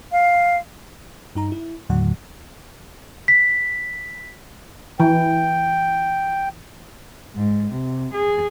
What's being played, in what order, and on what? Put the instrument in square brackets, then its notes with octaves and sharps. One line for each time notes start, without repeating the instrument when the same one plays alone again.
[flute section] F5
[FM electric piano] G2 D#4 A#5
E4
D#2 A2 D3 F#3 F#5
[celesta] B6
[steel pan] E3 [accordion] G5
[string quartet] G#2
C3
G#4